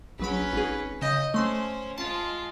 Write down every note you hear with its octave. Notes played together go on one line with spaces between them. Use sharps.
A#1 F#3 C#4 B4 B5
G#1 G#4
C#3 D#5 G6
A3 C#4 C5 C6
G#3 F4 A5